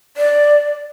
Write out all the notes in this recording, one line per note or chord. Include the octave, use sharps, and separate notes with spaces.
D5